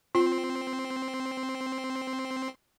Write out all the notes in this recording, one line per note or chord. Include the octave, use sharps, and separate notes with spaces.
C4 F4 C6